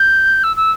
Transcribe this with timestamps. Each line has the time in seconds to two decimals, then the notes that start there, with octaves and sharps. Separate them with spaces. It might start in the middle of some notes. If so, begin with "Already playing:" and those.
Already playing: G6
0.43 E6
0.56 E6